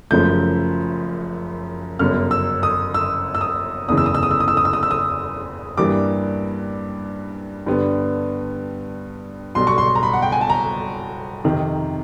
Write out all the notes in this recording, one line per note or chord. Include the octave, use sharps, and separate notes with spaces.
F#1 F#2 C#3 F3 A3 G6
G1 F#2 C#3 F6
E6
D#6
E6
E6
D#6
F#1 E2 C#3 E3 D#6
E6
D#6
E6
D#6
E6
D#6
E6
D#6
E6
D#6
E6
D#6
G2 E3 G3 A#3 D6
G2 D3 G3 B3
B1 B2 G3 C6
C#6
C6
A#5
B5
F#5
G5
G#5
A5
A#5
F2 C3 D#3